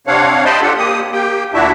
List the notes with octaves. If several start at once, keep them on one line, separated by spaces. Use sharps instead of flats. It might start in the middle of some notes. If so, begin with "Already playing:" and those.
C3 C4 D4 C#5 F5 F#5
C5 D#5 G5 A5 B5 C6
D4 F4 G4 A4 F#5
A#3 G4 D#6
A#3 G4 G5
D2 A#2 D4 E4 F#4 E5